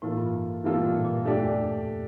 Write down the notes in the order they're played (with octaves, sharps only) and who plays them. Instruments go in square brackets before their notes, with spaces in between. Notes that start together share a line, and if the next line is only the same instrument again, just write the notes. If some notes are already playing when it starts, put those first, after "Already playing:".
[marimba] A2 [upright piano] E3 A#3 F4 A4
[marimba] G2
[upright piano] E3 G3 A#3 F4 A4
[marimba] A#2
A2
A#2
A#2
G2
[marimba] F2 [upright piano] A3 D4 G4 D5
[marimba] E2